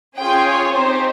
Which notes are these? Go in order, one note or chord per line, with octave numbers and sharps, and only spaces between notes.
C#4 F4 G#4 G5
C#5
C4 D#4 G4 C5